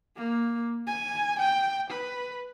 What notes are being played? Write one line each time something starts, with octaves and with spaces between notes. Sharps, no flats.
A#3
G#5
G5
B4